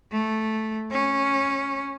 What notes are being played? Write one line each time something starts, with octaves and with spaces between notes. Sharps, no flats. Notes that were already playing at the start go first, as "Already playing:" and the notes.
A3
C#4